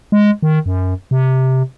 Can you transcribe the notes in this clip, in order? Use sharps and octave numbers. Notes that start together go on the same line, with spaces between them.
G#3
D#3
F#2
C3